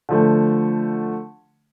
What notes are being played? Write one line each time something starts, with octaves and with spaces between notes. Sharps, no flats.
D3 F3 A3